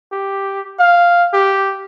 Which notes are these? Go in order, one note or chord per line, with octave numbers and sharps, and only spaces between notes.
G4
F5
G4